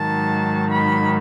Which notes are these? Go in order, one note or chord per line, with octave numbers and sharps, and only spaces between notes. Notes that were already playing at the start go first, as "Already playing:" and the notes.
Already playing: G#2 D#3 F#3 A5
B5